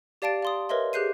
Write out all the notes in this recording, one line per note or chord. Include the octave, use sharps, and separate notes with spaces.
G4 D5 F5 A5 A6 D7
F5 C6 D#6
A#4 B4 C#5 D#5 E5 C6
G4 G#4 F#6 G6 C7 D#7